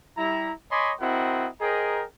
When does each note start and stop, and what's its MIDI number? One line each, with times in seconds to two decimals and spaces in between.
0.17 0.51 55
0.17 0.51 64
0.17 0.51 82
0.70 0.92 73
0.70 0.92 75
0.70 0.92 80
0.70 0.92 83
0.70 0.92 84
0.70 0.92 86
1.00 1.48 60
1.00 1.48 64
1.00 1.48 66
1.00 1.48 70
1.00 1.48 75
1.00 1.48 78
1.61 2.03 68
1.61 2.03 70
1.61 2.03 72
1.61 2.03 75
1.61 2.03 79
1.61 2.03 82